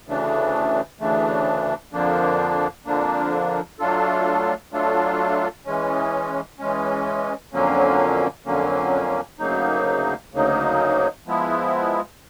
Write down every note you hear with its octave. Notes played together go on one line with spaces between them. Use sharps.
D2 C#3 E3 A3 D4
D2 C#3 E3 A3 D4
F2 D3 F3 A#3 D4
F2 D3 F3 A#3 D4
F#3 A3 D4 F4 A4
F#3 A3 D4 F4 A4
E3 G#3 C#4
E3 G#3 C#4
F2 D3 F#3 A#3 C#4
F2 D3 F#3 A#3 C#4
D2 C#3 F#3 A#3 D#4
D2 C#3 F#3 A#3 D#4
F3 G#3 B3 E4